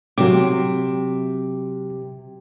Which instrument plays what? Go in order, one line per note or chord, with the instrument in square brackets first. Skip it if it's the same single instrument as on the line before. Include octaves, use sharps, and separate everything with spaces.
[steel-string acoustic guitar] C3 [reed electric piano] F#3 D6